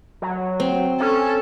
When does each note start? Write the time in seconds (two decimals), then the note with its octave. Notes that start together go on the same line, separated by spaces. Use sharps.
0.22 F#3
0.60 C4
1.00 C#4 A4